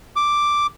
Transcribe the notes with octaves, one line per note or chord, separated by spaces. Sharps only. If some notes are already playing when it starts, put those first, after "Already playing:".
D6